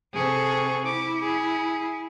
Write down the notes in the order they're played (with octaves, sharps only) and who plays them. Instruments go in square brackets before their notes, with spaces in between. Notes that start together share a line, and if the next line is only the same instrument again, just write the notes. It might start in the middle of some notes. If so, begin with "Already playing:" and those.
[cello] C3 A4 [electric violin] G#4 C#6
[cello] E4 [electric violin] D6
[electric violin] G#4